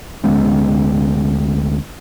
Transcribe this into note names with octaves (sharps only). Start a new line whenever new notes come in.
D2 G#3 B3 C#4